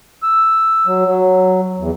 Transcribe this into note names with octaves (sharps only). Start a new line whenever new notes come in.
E6
F#3
F#3
E2